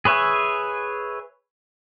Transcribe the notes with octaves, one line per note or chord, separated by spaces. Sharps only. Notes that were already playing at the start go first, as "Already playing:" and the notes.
G#4 B4 C#5 E5